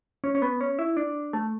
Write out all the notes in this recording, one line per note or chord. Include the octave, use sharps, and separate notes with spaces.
C#4
C#4
B3
C#4
E4
D4
A3